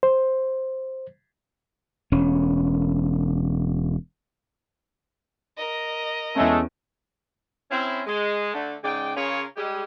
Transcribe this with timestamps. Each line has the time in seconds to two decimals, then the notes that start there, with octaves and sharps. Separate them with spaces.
0.03 C5
2.12 E1 C#4
5.57 A#4 D#5
6.36 E2 G#3 A3 C#4
7.71 C4 C#4 E4
8.06 G#3
8.53 D3 A3
8.83 G#2 C#3 G#3 D5 G5
9.16 C#3 C#4 F4 G#4 A#4 C#5
9.57 G3 G#3 G4